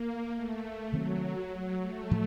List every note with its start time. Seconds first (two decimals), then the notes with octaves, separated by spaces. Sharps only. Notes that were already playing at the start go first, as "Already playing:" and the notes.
Already playing: A#3
0.34 A3
0.92 C3 D#3 F#3 A3 C4
1.52 F#3
1.81 A3
2.11 A2 F3